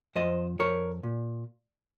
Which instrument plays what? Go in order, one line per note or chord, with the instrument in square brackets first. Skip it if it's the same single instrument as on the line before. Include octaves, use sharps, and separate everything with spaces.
[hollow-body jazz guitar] F2 C5 D#5
F2 A#4 C#5
A#2